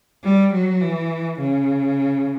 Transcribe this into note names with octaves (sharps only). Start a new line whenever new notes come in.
G3
F#3
E3
C#3